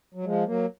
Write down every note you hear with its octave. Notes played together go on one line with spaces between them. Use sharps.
F#3
F3 G#3
F#3 A#3